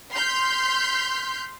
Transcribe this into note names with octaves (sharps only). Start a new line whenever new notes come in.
C6 F6 G6 B6